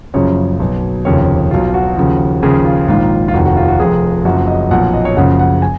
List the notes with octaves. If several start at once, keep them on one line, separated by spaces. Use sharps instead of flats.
F#1 F#2 C#3 F3 C#5
B1 B2
F1 D#2 C#3 F3 C#5
B1 B2 F4
F#4
D#2 C#3 F3
D#2 C#3 F3 G#4
F4
A#1 G#2 D#3 F4
F4
F1 D#2 D#3 F#4
F#4
F4
F#4
F1 F2 F3 G#4
F#1 F#2 F3 F#4
D#5
B1 A#2 F3 F#5
D#5
C#5
F#1 F#2 C#3 F3 F#5
F#5
G#5